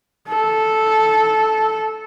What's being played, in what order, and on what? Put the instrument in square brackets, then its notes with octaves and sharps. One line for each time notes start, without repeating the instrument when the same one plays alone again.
[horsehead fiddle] A4